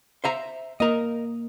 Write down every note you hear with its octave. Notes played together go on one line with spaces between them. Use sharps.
C5 E5 A#5
A#3 A#4 D#5